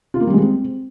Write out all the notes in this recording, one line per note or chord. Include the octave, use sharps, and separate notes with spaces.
F4
A#3
G3
G#3
C4